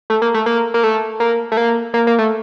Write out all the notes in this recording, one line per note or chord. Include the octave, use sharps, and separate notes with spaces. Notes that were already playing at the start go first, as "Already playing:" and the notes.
A3
A#3
A3
A#3
A#3
A3
A#3
A3
A#3
A#3
A#3
A3